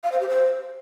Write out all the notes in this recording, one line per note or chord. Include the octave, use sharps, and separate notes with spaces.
F5
C5
G4
C5